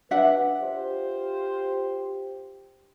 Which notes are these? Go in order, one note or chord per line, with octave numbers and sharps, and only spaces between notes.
D4 B4 E5 F#5
F4 G4 C5